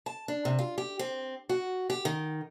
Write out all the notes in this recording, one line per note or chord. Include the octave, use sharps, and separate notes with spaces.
A5
D4
C3
F4
G4
C4
F#4
G4
D#3